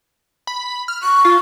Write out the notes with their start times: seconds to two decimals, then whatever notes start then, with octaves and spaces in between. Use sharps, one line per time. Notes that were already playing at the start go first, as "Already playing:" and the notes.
0.47 B5
0.88 F6
1.03 C#6 F#6
1.25 F4